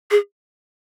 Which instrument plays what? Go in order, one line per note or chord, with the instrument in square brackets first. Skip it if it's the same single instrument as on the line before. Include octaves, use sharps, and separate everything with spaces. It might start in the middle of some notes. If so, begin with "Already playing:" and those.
[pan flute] G#4